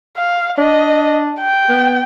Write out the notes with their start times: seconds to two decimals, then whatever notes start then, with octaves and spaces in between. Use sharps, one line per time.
0.17 F5
0.58 D4 D#5
1.41 G5
1.69 B3